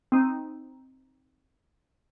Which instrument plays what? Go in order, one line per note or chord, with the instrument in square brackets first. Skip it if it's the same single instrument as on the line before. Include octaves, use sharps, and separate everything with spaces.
[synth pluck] C4 D#4